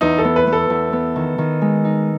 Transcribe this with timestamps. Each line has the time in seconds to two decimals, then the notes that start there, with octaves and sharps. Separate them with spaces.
0.01 E2 D#4
0.19 A4
0.25 B3
0.36 B4
0.47 B3
0.53 A4
0.70 E2
0.93 B3
1.16 D#3
1.38 D#3
1.62 G#3
1.85 D#4